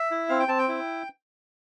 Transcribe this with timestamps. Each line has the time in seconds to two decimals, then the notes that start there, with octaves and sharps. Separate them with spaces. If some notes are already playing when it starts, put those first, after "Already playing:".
Already playing: E5
0.11 E4
0.29 C4 F5
0.40 G5
0.48 C4 A5
0.59 G5
0.68 E4